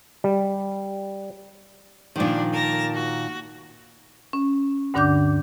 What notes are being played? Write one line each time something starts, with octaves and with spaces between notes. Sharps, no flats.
G3
A#2 D#3 F3 D4
A#4 A5 A#6
F#4
C#4
D2 G2 D3 D4 D6 G6